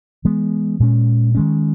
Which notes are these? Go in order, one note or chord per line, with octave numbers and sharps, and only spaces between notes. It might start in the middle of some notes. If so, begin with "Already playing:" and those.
E3 G#3 B3
A#2 G#3 C#4
D#3 G#3 C#4